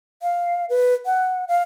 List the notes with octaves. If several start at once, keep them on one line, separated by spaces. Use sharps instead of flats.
F5
B4
F#5
F5